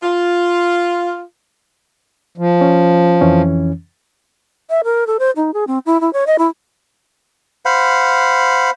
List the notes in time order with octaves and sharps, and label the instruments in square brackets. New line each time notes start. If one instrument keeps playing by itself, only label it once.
[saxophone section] F4
[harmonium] F3
[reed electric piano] C#4
F2 E3 C#4
[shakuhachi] E5
A#4
A4
C5
D#4
G#4
C4
E4
E4
C#5
D#5
E4
[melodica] C5 F5 F#5 B5